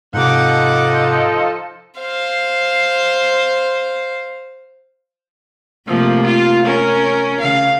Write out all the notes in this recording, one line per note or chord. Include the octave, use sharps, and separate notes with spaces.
G#2 C3 F3 D#4 A4 F#5 D6
C5 F5
C3 F3 A3 A#3
F4
C#4 A#4
C#3 F5